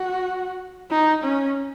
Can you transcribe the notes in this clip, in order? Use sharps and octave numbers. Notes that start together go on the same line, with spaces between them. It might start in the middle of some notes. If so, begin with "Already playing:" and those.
Already playing: F#4
D#4
C#4